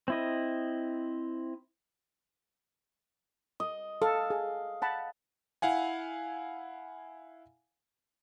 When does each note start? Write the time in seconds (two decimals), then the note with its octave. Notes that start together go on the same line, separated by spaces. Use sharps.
0.08 C4 E4 D#5
3.60 D#5
4.02 A4 F5
4.30 G#4
4.82 F#5 A5 B5
5.62 E4 F5 F#5 G#5